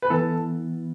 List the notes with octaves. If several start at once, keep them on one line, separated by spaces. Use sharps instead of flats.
B4
E3 B3 E4 A4